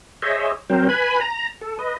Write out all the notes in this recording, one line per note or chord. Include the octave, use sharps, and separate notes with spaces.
G#4 C5 C#5 D#5 E5
F#3 C4 A#4 C5
B4 G#5 B5
A#5
A4
B4 D#5